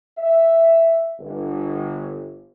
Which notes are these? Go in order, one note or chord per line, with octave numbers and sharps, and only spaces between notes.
E5
G1